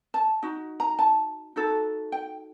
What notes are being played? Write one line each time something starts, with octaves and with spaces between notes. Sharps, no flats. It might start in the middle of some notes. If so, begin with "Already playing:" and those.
A5
D#4 F#4
A#5
A5
D#4 F#4 A4
G5